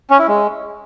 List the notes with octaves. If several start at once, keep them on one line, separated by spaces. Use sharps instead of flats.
C#4
E4
G#3